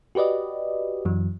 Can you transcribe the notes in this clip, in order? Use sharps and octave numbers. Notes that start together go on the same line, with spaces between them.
F#4 G4 B4 D5 D#5
F#2 E3 F#3